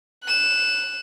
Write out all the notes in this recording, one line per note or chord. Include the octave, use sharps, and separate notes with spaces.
F#6 E7